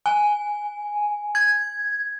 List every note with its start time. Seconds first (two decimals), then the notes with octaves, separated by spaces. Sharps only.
0.06 G#5
1.35 G#6